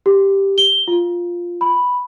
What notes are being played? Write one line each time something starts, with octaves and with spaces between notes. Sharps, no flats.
G4
G7
F4
B5